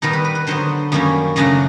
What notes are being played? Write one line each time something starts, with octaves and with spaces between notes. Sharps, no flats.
D#3 G3 B3 D#4 A#4
B4
B4
B4
D3 F#3 B3 C5
F#2 D#3 G3 A#3 C#4
F#2 C#3 F#3 A3 D4 D#5